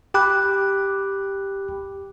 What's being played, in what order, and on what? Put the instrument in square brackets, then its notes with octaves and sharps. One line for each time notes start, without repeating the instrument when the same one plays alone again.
[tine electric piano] G4 G5 B5 D6 F#6